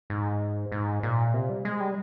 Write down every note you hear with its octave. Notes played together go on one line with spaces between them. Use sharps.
G#2
G#2
A#2
C3
G3
G#3
G3